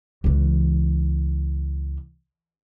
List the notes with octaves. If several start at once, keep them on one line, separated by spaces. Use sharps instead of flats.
C#2 E3